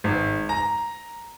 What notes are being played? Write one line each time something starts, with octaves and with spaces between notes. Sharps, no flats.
G#1
A#5